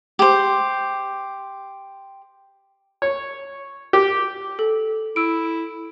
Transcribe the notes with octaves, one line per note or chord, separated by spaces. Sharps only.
G4 C5
C#5
G4
A4
E4 E6 D7